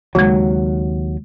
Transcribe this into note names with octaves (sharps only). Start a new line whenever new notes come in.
D#2 C#3 F#3 G#3